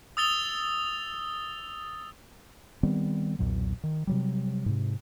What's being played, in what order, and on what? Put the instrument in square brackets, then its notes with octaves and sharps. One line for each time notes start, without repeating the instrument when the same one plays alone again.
[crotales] D#6 E6 A6 F7 G7
[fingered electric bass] D#3 G3 B3 C4
B1 E2 A#2 F#3
D#3
C3 F#3 G3
G#2 C3